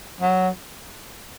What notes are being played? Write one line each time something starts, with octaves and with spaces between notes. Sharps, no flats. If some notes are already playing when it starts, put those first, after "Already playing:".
F#3